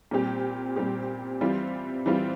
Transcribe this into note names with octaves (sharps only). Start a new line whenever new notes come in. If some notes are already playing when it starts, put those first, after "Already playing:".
A#2 G3 C4 G4
A#2 G3 C4 G4
E3 G3 C4 F4
E3 G3 C4 F4